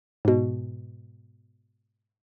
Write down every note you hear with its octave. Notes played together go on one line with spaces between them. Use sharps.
G#2 B2